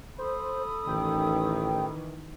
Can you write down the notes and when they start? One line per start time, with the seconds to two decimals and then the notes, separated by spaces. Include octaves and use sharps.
0.18 A4 C5 B5 D#6
0.87 A1 D#3 E3 G5